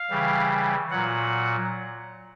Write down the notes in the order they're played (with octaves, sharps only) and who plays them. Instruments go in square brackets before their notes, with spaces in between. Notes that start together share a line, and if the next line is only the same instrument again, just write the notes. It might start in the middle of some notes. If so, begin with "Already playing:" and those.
Already playing: [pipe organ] F5
C#3 E3 G3
A#2 F#3 F#5